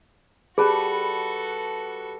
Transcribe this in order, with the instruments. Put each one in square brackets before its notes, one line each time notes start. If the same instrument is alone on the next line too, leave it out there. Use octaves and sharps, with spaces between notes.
[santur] G3 B4 A5 [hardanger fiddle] F#4 A4 [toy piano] G#4